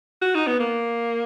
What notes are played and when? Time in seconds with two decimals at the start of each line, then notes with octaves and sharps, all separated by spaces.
0.21 F#4
0.35 D#4
0.47 B3
0.60 A#3